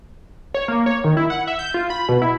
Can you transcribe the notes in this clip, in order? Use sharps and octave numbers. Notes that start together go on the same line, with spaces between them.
C#5
A#3
C#5
D#3
E4
F#5
E5
G6
F4
B5
B2
E4